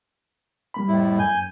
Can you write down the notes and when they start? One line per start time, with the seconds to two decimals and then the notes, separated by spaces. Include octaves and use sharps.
0.74 G3 A#3 B5
0.88 F2 A2 E4
1.19 F#2 G#5 G6